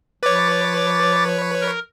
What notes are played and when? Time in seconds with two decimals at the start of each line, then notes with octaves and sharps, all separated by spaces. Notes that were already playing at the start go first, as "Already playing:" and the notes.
0.23 F3 B4 C#5 D6 A6
1.62 A#4